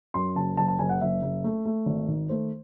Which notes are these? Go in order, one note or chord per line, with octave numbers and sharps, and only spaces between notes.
F#2 C6
F#1 A5
F#1 A5
A5
F#1 G#5
F#5
F#1 E5
F#1
A3
A3
G#1
D#3
A3 C5